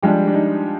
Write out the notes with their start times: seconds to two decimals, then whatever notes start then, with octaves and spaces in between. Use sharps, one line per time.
0.02 F3 G3 G#3 D4 G4
0.27 D4
0.34 D#4